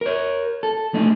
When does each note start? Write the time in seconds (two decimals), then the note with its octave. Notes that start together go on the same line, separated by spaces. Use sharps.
0.01 A#4 C#5
0.63 A4
0.94 A3 D4 D#4